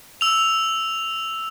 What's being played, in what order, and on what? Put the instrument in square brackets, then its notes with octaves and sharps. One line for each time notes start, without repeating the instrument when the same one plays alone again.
[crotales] E6 F7